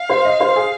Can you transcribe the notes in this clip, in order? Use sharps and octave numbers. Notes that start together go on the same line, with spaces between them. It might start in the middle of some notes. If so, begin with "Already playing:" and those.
Already playing: F5
C5
D#5
C5
G#4